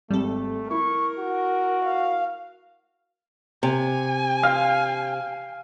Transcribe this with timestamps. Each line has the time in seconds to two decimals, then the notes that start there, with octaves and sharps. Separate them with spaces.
0.10 G#1 G3 A3 A4
0.71 E4 A#4 C#6
1.20 F#4
1.85 F5
3.63 C3 G#5
4.43 F5